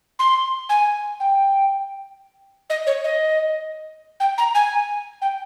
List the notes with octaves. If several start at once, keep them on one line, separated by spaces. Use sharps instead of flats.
C6
G#5
G5
D#5
C#5
D#5
G5
A#5
G#5
G5